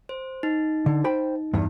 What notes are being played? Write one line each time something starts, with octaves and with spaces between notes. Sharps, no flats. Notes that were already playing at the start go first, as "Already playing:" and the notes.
C5
D#4
D3
C5 G5 B5
E2 G2